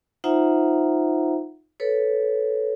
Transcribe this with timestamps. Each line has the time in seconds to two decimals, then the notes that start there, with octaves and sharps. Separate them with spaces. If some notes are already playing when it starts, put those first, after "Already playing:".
0.24 D#4 F4 C5 E5 F#5 A#5
1.80 A4 B4 C#5